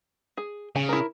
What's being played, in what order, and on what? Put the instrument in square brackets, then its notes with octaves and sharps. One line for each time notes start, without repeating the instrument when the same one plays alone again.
[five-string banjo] G#4
[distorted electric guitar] C#3 [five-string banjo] G#5
[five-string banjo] E4 A#4